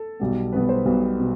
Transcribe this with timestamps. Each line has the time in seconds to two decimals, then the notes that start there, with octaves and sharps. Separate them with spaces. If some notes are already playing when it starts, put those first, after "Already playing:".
Already playing: A4
0.20 B1 B2 G3 B3
0.53 B1 B2 G3 B3 B4
0.69 C5
0.85 B1 B2 G3 B3
1.20 B2